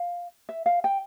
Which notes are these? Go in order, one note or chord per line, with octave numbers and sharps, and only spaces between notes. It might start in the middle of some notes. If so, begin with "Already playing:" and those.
Already playing: F5
E5
F5
G5